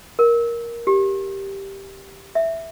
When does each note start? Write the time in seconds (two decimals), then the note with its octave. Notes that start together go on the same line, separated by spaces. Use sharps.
0.19 A#4
0.87 G4
2.35 E5